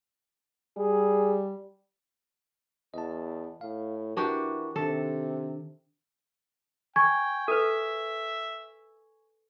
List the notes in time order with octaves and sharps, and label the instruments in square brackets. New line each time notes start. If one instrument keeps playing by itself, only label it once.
[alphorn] G3 [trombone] G#4
[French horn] E2 [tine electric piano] D#5 A5
[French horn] A2 [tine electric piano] F5
[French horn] E3 [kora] D4 F#4 G4 [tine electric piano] A#4 C#6
[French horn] C3 [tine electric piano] D#3 D4 [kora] A4
[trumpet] G5 [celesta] G#5 C#6 G#6
[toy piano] A4 B4 [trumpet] E5